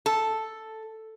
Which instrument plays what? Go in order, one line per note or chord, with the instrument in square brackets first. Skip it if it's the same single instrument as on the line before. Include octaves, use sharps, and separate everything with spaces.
[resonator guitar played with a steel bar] A4